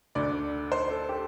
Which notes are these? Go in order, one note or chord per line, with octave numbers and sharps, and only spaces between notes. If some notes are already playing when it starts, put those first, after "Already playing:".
D2 D3 D5
C5
A4
G4